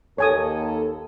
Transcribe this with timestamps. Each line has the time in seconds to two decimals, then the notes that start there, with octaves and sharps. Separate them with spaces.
0.18 D#2 A4 C#5 G#5 D#6